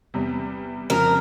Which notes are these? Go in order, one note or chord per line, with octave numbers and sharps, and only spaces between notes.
E2 C3 G3
F2 C#3 F3 A#4